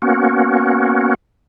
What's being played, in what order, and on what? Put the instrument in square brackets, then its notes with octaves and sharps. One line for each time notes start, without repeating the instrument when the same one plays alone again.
[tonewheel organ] A#3 B3 C#4 F#4